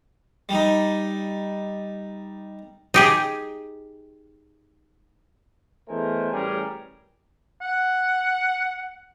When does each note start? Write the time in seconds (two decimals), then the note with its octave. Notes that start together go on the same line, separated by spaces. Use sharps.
0.49 G3 D#4
2.94 D#4 G4 G#4
5.88 E2 A3 A#4 C5 D#5 G#5
6.32 A1 G3 C#4 G4 G#4 A#4
7.62 F#5